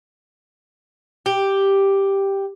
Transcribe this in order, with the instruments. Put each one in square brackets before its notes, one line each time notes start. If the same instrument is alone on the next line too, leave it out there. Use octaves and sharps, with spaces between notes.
[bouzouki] G4